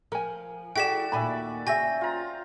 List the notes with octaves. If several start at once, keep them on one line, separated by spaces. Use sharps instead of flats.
F3 A#4 G#5
E4 F#4 G#4 A4 D5 G5 B6 E7
D#2 A#2 D5 E5 G#5 B5
C#3 F#4 E5 G5 G#5 E6 A#6
F4 C5 A#5